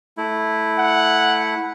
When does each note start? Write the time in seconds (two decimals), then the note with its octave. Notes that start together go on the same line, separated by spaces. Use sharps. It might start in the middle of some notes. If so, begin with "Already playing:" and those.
0.17 A3 E4
0.79 F#5